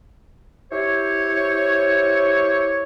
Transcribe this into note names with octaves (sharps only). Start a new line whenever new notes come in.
E4 G4 C5 C#5